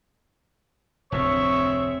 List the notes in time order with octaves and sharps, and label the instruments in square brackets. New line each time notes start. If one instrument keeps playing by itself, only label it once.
[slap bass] F1 D2 A2 [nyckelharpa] C4 E5 [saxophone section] G#4 C#5 [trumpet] C#6